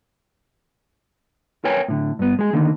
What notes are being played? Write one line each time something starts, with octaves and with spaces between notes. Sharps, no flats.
A#4 B4 C#5 G5 G#5
A2 D3
G2 B3
G#3 G#4
D3 D#3 A#3